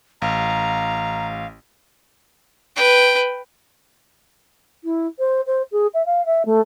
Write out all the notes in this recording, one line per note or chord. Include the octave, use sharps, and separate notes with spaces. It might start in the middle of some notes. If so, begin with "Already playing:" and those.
A1 F5 A#5
B4 G5
E4
C5
C5
G#4
E5
F5
E5
A3